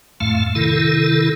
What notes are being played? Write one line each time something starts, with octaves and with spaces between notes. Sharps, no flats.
F2 A2 A3 F5
C3 D#3 E4 A4